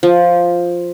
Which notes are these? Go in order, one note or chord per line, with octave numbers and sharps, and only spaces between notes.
F3